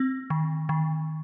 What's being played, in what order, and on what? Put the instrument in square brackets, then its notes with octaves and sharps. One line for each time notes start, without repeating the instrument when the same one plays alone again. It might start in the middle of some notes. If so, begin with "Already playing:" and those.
Already playing: [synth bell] C4
D#3
D#3